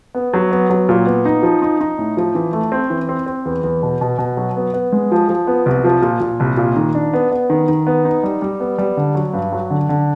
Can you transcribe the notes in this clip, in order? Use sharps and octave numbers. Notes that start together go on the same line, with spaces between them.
B3
F#3
B3
F#3
A#2
B3
D#4
F3
D#4
D#4
A2
F3
E3
A3
C4
E3
C4
C4
E2
E2
B2
B2
B2
F#3
B3
B3
G#3
F3
F3
B3
C2
F3
A#2
A#2
C2
A#2
D#3
D4
B3
B3
D#3
D#3
B3
D#4
G3
G3
B3
G3
D3
F#3
G2
F#3
D3
D3